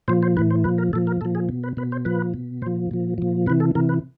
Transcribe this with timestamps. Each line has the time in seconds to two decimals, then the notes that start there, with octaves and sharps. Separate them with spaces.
0.08 A#2 F3 C5
0.23 C5
0.37 A2 E3 B4
0.51 C5
0.64 A#2 F3 B4
0.78 A#4
0.93 A#2 F3 A4
1.07 A#4
1.21 A#2 F3 A4
1.35 G#4
1.49 B2
1.64 B4
1.77 B2 B4
1.92 C5
2.05 A#2 F3 B4
2.34 B2
2.62 A#2 C5
2.66 F3
2.91 A#2 F3
3.18 A#2 F3
3.46 C3 E3 B4
3.60 A4
3.75 C3 E3 A#4
3.89 B4